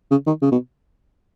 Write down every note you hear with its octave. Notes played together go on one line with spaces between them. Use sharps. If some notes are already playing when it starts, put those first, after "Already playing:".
C#3
D#3
C#3
B2